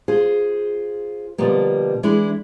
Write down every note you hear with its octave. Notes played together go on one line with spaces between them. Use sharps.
F4 G#4 C5
B2 D3 F3 G3 A#3
E3 G#3 D4 E4